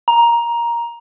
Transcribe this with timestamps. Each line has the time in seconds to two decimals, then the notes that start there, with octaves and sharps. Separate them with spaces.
0.08 A#5